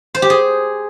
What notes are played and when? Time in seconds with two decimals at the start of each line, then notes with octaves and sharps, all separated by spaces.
0.15 C5
0.22 G4
0.30 G#4